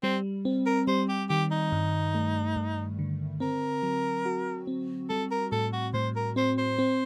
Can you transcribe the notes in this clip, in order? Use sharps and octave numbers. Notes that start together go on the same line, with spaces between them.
G3 C4
C4
A#4
G3 C5
G4
D#3 G4
D#4
G2
A3
G2
D3
C4 A#4
F#3
F#4
C4
G3 A4
A#4
A2 A4
F#4
A2 C5
A#4
C4 C5
C5
C4